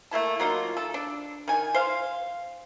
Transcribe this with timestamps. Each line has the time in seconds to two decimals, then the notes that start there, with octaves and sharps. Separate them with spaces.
0.11 A3 A#3 E4 A5
0.40 F#3 A#3 D#4 F4
0.77 A4
0.94 D4
1.48 D#3 G#5
1.74 C5 F5